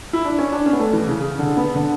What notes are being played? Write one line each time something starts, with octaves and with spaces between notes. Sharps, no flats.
E4
D4
C#4
D4
C#4
B3
A3
E3
C#3
C#3
D3
B3
D3